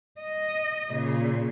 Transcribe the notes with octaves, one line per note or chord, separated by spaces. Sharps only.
D#5
A#2 C#3